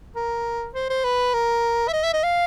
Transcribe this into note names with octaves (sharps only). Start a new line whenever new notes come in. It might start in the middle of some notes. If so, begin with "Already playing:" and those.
A#4
C5
C5
B4
A#4
E5
D#5
E5
D#5
F5